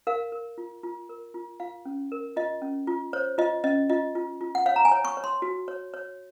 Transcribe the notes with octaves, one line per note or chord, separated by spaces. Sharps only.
A#4 F5
A#4
F4
F4
A#4
F4
F4 F5
C#4
A#4
F4 D#5
C#4
F4
C5 C#5
F4 D#5
C#4 D#5
F4 D#5
F4
F4
F#5
C#5 F5
A#5
G#5
C#5
C#6
C#5
C6
F#4
C#5
C#5